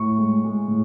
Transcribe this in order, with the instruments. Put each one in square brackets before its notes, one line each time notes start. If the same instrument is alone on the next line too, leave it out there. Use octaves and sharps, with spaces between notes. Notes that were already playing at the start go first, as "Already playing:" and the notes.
Already playing: [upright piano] A2 C#6
G#3
G#3
A2